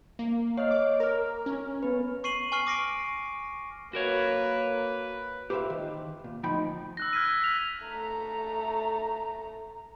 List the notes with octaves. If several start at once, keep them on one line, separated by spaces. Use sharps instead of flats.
A#3
C#5 D#5 F5 F6
D6
A#4 A#5 F6
C#4
B3 B4
C#6 C7 D#7 F#7
G#5 C#6 F6 C7
D6 A#6 C7 D7
A#3 F#4 A#4 B4 C#5
G4 B4 C5 D5 E5 F5
D#3
A#2
D2 F3 D#4 G5 B5
E6 F#6 A#6
F6 G#6 B6 D#7
B6 F7
A3 A#5